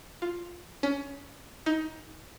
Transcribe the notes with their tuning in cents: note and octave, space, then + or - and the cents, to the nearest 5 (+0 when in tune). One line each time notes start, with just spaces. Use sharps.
F4 +5
C#4 +25
D#4 +20